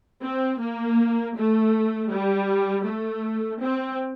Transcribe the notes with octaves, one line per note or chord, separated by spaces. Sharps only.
C4
A#3
A3
G3
A3
C4